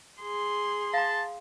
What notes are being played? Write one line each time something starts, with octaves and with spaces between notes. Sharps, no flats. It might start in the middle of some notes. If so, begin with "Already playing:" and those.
G#4 C6
F5 A5 A#5